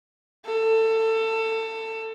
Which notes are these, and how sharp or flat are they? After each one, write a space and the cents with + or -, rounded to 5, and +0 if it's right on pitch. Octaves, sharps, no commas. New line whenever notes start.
A4 +25